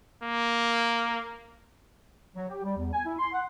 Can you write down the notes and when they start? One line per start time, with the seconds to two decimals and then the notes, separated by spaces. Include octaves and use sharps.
0.23 A#3
2.36 F#3
2.49 G4
2.64 G3
2.78 E2
2.93 G#5
3.06 E4
3.19 C6
3.33 F#5